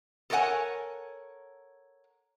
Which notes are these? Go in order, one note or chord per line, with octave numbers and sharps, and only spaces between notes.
A4 A#4 C#5 D5 F#5 G#5